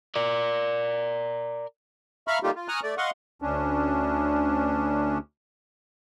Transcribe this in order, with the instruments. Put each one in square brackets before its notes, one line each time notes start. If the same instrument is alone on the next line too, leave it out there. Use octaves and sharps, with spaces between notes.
[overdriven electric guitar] A#4 D5
[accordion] E5 F5 A#5 B5 C#6 F6
G3 A3 A#3 D#4 F4 G4
F4
G#5 A#5 C#6 D#6 F6 F#6
A3 D5
D#5 F5 F#5 C6 C#6
D2 C#4 D4